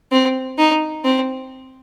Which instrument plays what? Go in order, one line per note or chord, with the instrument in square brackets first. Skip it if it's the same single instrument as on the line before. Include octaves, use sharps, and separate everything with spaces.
[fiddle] C4
D#4
C4